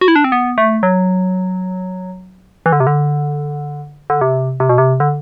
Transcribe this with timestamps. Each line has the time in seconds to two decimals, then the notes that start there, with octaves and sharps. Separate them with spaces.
0.01 F#4
0.08 E4
0.16 D4
0.24 C4
0.32 B3
0.58 A3
0.83 F#3
2.66 E3
2.72 D3
2.80 C3
2.87 D3
4.10 D3
4.21 C3
4.60 C3
4.69 B2
4.78 C3
5.00 D3